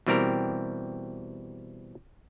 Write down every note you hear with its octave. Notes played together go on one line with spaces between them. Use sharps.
B2 E3 G3 C4 G4 A#4